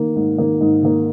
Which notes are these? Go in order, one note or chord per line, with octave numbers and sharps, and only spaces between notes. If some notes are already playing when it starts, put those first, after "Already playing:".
Already playing: D#3 A#3
G#2
D#3 A#3
G#2
D#3 A#3